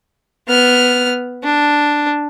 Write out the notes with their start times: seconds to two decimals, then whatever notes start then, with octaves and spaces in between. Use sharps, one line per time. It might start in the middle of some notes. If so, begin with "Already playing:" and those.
0.48 B3 F6
1.43 D4